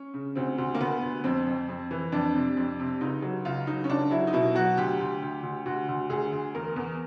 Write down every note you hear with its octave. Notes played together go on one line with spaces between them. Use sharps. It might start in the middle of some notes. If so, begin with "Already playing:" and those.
Already playing: C#4
C#3
D2 C4
D2
A#3
D2 B3
D2
F2 C4
F2
F2
E3
F2 D4
C3
F2
C3
C#2 D#4
F#3
C#2 F4
F#3 D#4
C#4
C#2 D4
F#3 E4
D#4
B2 E4
F#3 F#4
D2 G4
D2
D2
D2
D2 F#4
D2
D2 G#4
D2
E2 A#4
E2